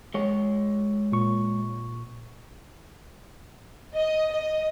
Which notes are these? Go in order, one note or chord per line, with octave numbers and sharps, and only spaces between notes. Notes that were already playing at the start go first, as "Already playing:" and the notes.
G#3 C#5
A#2 C#6
D#5
D#5